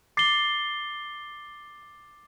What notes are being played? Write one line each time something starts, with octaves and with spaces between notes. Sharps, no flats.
D6 A6 C7 G7